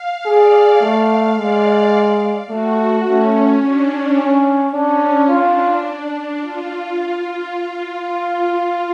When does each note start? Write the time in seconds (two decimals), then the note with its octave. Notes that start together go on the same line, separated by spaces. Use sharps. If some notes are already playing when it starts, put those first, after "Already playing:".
Already playing: F5
0.26 G#4 D5
0.81 A3 F5
1.37 G#3 D5
2.49 A3 F#4
3.05 A3 C#4
3.62 D4
4.17 C#4
4.73 C#4 D4
5.29 D4 F4
6.41 F4
8.08 F4